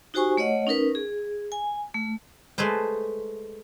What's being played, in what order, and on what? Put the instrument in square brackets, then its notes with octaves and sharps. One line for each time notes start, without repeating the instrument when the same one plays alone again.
[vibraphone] D#4 F#4 G4 C5 G#5 C#6
A3 C#5 D#5 F#5
C#4 D#4 A#4 B4
G#4
G#5
A3
[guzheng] G#3 A3 G#4 B4 C5